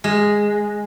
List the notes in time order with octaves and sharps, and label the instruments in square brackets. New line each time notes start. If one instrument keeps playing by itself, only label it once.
[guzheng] G#3